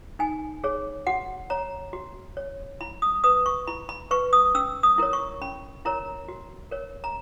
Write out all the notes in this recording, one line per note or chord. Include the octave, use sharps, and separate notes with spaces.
D#4 G#5
G#4 C#5
F#4 F#5
C#5 A#5
F#4
C#5
E4 B5
D#6
B4 D#6
C#6
E4 B5
B5
B4 C#6
D#6
C#4 E6
D#6
E4 A#4 C#5
C#6
C#4 B5
E4 A#4 C#5 A#5
F#4
A#4 C#5
A#5